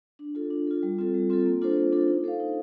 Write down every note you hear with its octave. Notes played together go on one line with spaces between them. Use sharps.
D4
F4 A4
D4
F4 A4
G3
C4 F4 A4
G3
C4 F4 A4
A#3
D4 F4 A4 C5
A#3
D4 F4 A4 C5
D#4
A4 C5 F5
D#4